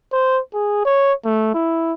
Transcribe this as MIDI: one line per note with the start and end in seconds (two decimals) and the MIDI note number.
0.12 0.40 72
0.54 0.81 68
0.85 1.13 73
1.25 1.54 57
1.54 1.93 64